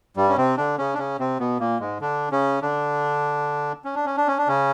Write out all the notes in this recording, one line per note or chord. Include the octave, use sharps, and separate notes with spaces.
G2 G3
C#4
C3 C4
D3 D4
C#3 C#4
D4
C#3 C#4
C3 C4
B2 B3
A#2 A#3
G#2 G#3
D3 D4
C#3 C#4
D3 D4
C#4
D4
C#4
D4
C#4
D4
C#3 C#4